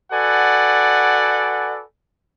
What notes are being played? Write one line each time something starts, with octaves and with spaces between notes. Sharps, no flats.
F#4 A4 B4 D5 F#5 G#5